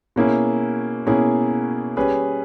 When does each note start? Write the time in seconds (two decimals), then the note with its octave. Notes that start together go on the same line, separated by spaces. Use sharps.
0.16 B2 A#3 C#4 E4 G#4
1.07 B2 A#3 C#4 E4 G#4
1.97 G3 C#4 G#4 B4